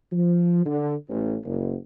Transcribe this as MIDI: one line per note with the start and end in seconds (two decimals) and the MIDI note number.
0.13 0.63 53
0.66 0.95 50
1.09 1.35 33
1.45 1.75 30